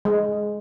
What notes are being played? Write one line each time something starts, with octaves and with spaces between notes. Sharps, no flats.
G#3